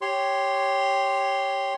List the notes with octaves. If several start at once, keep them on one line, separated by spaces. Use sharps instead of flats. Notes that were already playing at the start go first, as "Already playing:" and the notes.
G4 C#5 C6